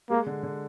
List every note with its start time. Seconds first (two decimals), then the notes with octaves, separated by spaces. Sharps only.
0.10 G#3 A#3
0.26 D3
0.43 D3